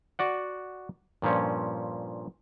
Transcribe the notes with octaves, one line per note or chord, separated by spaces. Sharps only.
F#4 D5 F#5
G2 A#2 F3 C#4